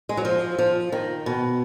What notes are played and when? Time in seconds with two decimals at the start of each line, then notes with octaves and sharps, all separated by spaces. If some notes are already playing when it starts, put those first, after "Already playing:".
0.09 G#3
0.17 F#3
0.25 F3
0.59 F3
0.92 D#3
1.26 B2